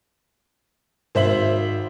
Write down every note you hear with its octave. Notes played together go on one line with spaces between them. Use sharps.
G#1 C5 E5 F#7